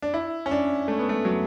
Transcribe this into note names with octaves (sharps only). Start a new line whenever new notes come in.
D4
E4
C#4
D4
A3
B3
A3
F#3